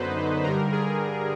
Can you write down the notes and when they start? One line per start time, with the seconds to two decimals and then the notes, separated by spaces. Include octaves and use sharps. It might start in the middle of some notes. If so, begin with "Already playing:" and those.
Already playing: F#2 D3 F#3 B3 D#4 B4 C5
0.43 G2 D3 G3 A#4
0.72 G#4